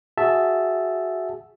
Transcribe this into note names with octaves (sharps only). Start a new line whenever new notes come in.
F#4 G#4 E5 A5